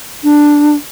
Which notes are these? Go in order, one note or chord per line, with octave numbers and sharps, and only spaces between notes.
D4